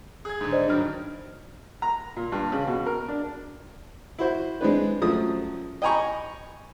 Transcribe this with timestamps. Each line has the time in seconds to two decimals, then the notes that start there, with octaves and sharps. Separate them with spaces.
0.25 G#4 G#6
0.41 G#2 D3
0.53 C5 D5 D#5
0.68 G2 D#3 F#3 D4 F6
1.82 A#5
2.17 A#2
2.32 G2
2.52 C#3
2.67 B2
2.86 A#4
3.09 D4
4.19 E4 F#4 C5
4.61 G#3 C4 D4 B4
5.02 F#2 F3 A3 D#6
5.82 D#5 G5 G#5 A#5 B5 C#6